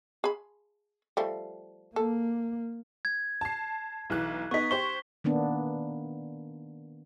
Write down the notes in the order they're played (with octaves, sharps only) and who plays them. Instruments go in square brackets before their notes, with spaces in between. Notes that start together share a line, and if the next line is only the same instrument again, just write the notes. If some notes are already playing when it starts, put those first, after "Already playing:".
[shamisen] G#4 B5
F3 G3 A3
[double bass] A#3 [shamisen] A4
[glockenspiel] G#6
[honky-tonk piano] A5 C7
B1 E3 F#6
[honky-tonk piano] B3 D#4 [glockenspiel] C#6 B6
[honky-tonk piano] G4 C5 C#6 [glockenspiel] G7
[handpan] D#3 A#3 B3 D4